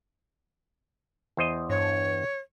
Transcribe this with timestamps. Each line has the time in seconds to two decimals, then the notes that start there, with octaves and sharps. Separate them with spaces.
1.37 E2 C5 D#5
1.70 G2 C#5